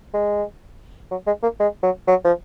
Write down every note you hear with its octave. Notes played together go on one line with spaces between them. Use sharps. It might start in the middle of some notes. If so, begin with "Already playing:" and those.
G#3
F#3
G#3
A#3
G#3
F#3
F#3
F3